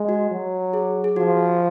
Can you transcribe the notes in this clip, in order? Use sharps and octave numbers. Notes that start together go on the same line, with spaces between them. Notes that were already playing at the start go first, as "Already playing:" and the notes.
Already playing: G#3
F#4
F#3
G#4
G#4
F3 F#4